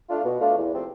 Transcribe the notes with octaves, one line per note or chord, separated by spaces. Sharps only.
A3 D4 F4
B2
A3 D4 F4
E2
C3 F3 A3 C4